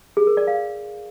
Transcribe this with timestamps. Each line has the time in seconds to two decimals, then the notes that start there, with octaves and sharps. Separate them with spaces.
0.17 G#4
0.27 A#4
0.37 D5
0.47 F5